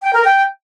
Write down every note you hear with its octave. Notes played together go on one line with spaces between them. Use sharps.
G5
A#4
G5